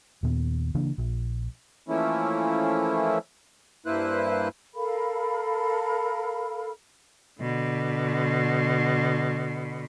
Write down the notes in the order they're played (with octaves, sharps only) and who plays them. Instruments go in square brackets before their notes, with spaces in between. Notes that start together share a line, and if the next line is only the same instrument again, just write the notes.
[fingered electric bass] D#2 A#2 B3
C#3 E3 A#3 D4
A#1
[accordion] E3 F3 A3 A#3 C#4 E4
G2 A#3 E4 B4 C5 F#6
[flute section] A4 A#4 F5 B5
[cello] B2 D3